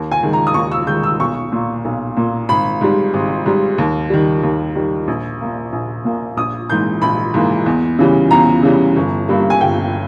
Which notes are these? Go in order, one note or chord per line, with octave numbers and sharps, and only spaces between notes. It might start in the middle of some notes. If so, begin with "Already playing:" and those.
Already playing: D#2
G#5
D#3 G#3
A#5
D#6
D#2 C#6
E6
D#3 G#3 G6
E6
B1 C#6
A#2 A#3
B1
A#2 A#3
G#1 B5
G#2 G3
G#1
G#2 G3
D#2
D#3 G3
D#2
D#3 G3
A#1
A#2 A#3
A#1
A#2 A#3
A#1 D#6
G#2 E3 A#3 G6
A#1 B5
G#2 E3 A#3
E2
C#3 E3 G3
E2 A#5
C#3 E3 G3
G1
G2 G3 A#3
G#5
G1 G5